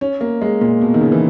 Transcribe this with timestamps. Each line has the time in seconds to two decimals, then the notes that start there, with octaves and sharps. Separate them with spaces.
0.01 C#4
0.21 A#3
0.42 G#3
0.61 A#2
0.82 B2
0.94 D#3
1.01 C#3
1.12 E3